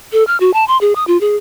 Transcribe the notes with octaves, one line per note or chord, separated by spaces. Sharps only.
A4
F6
F#4
A5
C6
G#4
D#6
F4
G#4